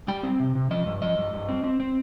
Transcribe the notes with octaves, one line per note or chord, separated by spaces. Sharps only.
G3 G5
C4
C3
C3
F3 D#5
G2
F3 D#5
G2
G2
C4
C4
C4